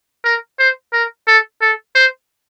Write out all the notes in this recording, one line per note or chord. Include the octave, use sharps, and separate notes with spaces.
A#4
C5
A#4
A4
A4
C5